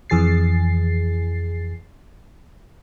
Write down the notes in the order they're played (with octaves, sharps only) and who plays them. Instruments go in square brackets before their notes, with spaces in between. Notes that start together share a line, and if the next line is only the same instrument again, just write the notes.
[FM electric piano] F2 E3 G#4 A6 C7